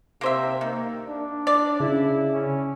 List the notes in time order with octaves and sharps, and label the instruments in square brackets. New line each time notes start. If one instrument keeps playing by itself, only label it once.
[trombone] C3 [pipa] A#3 C5 E5
[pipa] D#3 [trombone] A#3
[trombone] D4
[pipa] D5
[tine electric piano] C#3 [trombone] E4
[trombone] C#4